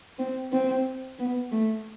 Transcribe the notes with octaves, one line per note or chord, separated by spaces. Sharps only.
C4
C4
B3
A3